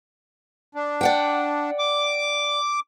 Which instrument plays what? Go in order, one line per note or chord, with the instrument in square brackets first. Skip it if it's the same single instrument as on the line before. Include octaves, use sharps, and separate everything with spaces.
[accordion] D4
[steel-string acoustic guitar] D5 F#5 G5
[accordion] D6